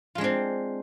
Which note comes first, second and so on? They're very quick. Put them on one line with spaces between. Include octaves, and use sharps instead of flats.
F4 G#3 D4 C4